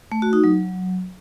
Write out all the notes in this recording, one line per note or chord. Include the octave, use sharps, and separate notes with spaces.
A3
F#4
D#4
F#3